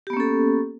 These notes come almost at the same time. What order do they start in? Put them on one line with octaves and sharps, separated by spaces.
G4 B3 A#3 C#4 A4